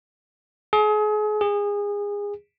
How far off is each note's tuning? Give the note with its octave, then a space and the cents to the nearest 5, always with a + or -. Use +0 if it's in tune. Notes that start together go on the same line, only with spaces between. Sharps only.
G#4 +35
G#4 -25